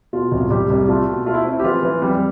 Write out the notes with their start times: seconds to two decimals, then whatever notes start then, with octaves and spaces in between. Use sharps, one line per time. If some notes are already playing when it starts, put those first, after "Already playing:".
0.13 B2 F4
0.32 C2
0.41 F4
0.51 C2 G3 G4
0.70 C2
0.88 A3 F4
1.08 B2
1.26 A3 F4
1.34 E4
1.45 C4 E4
1.59 G4
1.64 E3 F4
1.83 E3
2.02 F2 G3 G4